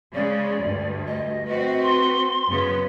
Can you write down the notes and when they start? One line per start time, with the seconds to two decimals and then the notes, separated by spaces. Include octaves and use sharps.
0.14 C#3 G#3 D5
0.61 D2 G2
1.07 D#5
1.48 C4 F#4 B4
1.83 C6
2.47 F#2 C#3 B3